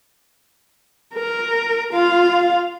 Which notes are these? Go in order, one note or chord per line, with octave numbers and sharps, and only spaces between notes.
A#4
F4 F5